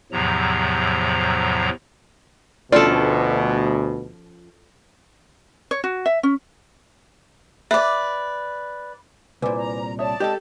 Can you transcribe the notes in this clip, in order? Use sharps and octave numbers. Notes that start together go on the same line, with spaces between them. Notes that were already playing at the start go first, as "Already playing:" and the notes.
E2 A2 C3 F3 F#3 A#5
D2 B2 F3 C#4 F4 A4 D5
C#5
F#4
E5
C#4
B4 D5 E5
C2 A#2 E4 B4 C5 G#5 D6
A#5
C#5 D5 E5 A5 D#6
G#3 C4 G4 A4 D#5